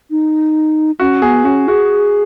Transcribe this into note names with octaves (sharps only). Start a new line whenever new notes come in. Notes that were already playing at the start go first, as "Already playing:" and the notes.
D#4
C#4 F#4
B3 G#4
C#4 F#4
F#4 G#4